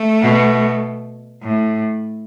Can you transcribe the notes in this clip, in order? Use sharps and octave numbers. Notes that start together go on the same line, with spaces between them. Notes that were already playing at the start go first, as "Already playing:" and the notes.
Already playing: A3
B2
A2